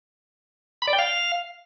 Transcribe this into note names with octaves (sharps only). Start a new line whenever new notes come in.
B5
D5
G5
F5